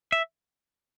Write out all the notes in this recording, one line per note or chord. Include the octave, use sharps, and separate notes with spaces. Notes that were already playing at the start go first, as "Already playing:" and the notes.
E5